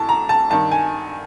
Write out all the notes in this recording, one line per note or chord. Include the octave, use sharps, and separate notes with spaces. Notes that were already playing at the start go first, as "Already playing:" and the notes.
Already playing: A2 E3 A5
A#5
A5
G2 D#3 A5
G#5